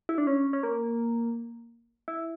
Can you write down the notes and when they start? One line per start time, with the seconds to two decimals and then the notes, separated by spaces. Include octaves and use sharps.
0.09 E4
0.18 D4
0.27 C#4
0.53 C#4
0.63 A#3
2.08 E4